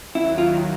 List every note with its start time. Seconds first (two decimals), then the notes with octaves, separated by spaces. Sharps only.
0.15 D#2 D#3 F#3 E4
0.38 F4